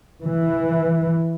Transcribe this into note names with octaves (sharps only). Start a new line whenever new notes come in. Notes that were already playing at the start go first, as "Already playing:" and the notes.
E3